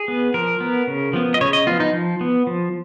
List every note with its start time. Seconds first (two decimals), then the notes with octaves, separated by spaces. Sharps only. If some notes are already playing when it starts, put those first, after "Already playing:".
Already playing: G#4
0.08 B3
0.34 F3 A#4
0.61 B3
0.87 C#3
1.13 F3 B3
1.34 D#5
1.41 C#3 C#5
1.53 D#5
1.66 F3 B3 F4
1.80 D#4
1.93 F3
2.21 B3
2.47 F3